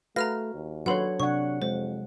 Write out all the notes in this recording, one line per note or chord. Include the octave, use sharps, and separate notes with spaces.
A3 F#4 B4 F5 A#5 F6 A#6
D#2
F#3 D4 F#4 A4 B4 C#5 F#5 C6
C3 D4 C#5 F#5 C#6
F2 G#3 C5